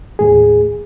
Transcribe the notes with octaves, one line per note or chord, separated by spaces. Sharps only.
D#2 A2 G#4